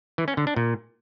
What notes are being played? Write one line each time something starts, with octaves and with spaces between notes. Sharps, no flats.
E3
C#4
D3
D4
A#2